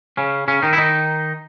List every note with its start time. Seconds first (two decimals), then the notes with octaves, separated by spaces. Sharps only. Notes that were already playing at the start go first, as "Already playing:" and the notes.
0.17 C#3 C#4
0.48 C#3 C#4
0.62 D#3 D#4
0.73 E4
0.78 D#3 D#4